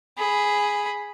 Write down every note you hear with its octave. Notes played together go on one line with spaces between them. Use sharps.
G#4 B5